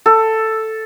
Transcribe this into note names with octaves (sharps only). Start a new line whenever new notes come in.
A4